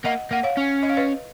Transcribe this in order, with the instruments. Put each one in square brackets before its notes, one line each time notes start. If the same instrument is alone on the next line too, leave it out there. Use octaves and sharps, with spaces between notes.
[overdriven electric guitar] A#3 [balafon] D#5 F#5
[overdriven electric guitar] A#3 [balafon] F#5
[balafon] C#5 F5
[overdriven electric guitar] C#4
[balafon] D#5
F5
B4 D#5